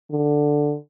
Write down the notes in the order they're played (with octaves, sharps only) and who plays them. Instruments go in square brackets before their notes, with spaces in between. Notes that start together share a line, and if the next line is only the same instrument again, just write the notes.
[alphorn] D3